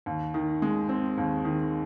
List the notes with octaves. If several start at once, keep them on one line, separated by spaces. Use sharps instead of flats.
D#2
D#3
G#3
C4
D#2
D#3